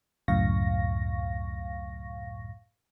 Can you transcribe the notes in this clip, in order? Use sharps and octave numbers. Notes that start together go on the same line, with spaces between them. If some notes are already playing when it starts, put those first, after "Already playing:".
C#2 F#2 A2 F5 C#6 A#6